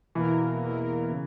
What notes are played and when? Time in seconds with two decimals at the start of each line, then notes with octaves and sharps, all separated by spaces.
0.15 E2 B2 E3 A#3 E4 A#4
0.63 E2 B2 A#3 E4 A#4
1.11 C#3